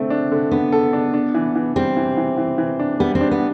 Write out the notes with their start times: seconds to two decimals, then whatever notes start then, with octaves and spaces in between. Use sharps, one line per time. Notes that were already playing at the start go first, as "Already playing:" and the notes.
Already playing: D3 A3 C4
0.10 D4
0.32 D3
0.51 D3 B3
0.72 A4
0.93 D4
1.14 D4
1.34 E3
1.55 E3
1.76 G3 C4
1.97 E3
2.17 E3
2.38 E3
2.58 E3
2.79 D4
3.00 G3 B3
3.15 C4
3.21 D4
3.31 B3